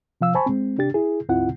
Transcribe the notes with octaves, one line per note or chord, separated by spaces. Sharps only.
C3 F3 F5 E6
C5 G#5 A5 B5 C#6
G#3 C4
C3 D4 G4 A6
E4 G#4
D2 G#2 C4 E4 F4 F#5